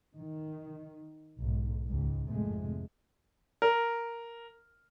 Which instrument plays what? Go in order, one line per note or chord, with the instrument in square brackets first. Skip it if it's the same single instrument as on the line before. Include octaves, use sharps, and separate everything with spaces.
[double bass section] D#3
B1 G#2
C#2 G#2
G#1 F2 C3 G#3 A3
[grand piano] A#4